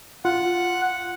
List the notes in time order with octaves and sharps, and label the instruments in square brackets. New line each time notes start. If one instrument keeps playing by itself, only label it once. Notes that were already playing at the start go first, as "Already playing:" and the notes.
[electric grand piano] F4 [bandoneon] F#5